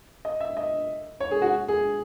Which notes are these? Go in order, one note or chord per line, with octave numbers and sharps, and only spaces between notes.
D#5
E5
D#5
C#5
G#4
F#4
G#4